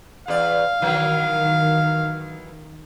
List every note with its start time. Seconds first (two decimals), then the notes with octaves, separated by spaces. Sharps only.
0.28 E2 D5 F5
0.82 D#3 E3 F#3